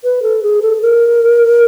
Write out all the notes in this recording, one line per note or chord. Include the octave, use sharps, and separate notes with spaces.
B4
A4
G#4
A4
A#4